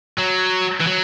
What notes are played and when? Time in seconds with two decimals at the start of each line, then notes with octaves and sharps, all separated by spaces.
0.18 F#3
0.80 E3
0.87 F#3